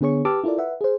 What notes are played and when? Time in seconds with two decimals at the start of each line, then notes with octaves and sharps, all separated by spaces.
0.01 D3 B3 G#4 C#5 C#6
0.25 G4 B4 A5 D6 E6 F6
0.44 E4 F4 A4 A#4 D5
0.58 B4 E5 F#5
0.81 G#4 C5